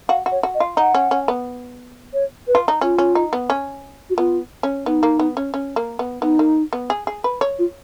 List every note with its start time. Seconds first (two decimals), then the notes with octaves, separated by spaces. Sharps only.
0.09 F#4 F5
0.26 F#4
0.32 C#5
0.43 F#4
0.55 D#5
0.60 F4
0.77 D#4 F#5
0.95 C#4
1.11 C#4
1.28 B3
2.13 C#5
2.48 B4
2.55 F4
2.68 D#4
2.81 C#4 F4
2.98 C#4
3.15 D#4
3.33 B3
3.50 C#4
4.10 F#4
4.17 B3 F4
4.63 C#4
4.86 B3 D#4
5.03 A#3
5.20 B3
5.37 C#4
5.54 C#4
5.76 A#3
5.99 B3
6.22 B3 D#4
6.39 A#3
6.73 B3
6.90 G#4
7.07 G#4
7.24 B4
7.41 C#5
7.59 F4